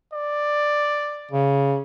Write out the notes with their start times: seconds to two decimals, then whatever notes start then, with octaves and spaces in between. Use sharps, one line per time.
0.13 D5
1.31 C#3